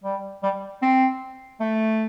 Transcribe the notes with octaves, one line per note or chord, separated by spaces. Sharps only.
G3
G3
C4
A3